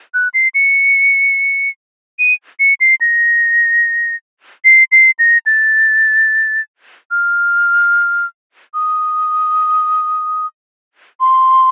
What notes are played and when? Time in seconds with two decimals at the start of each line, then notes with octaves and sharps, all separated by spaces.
0.14 F#6
0.34 C7
0.54 C#7
2.19 D#7
2.59 C#7
2.80 C7
3.01 A#6
4.65 C7
4.92 C7
5.19 A#6
5.46 A6
7.11 F6
8.74 D#6
11.20 C6